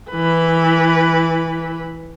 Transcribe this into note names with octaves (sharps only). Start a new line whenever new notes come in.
E3 B4